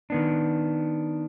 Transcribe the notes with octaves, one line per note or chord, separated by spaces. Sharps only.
D#3 B3 D4